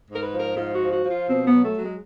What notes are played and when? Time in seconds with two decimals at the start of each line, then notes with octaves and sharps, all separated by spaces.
0.09 G#2
0.15 A#4
0.21 B4
0.33 F3
0.39 A#4
0.56 G#2 F4
0.74 F#4
0.80 F3
0.92 F#4
1.04 F3
1.10 F4
1.28 B2 C4
1.46 B3
1.51 F#3
1.64 A3
1.76 F#3
1.82 G#3